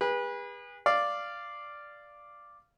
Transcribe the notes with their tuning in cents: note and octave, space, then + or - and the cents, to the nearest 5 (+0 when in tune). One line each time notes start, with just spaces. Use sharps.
G#4 -40 B4 -25
D5 +0 F5 -10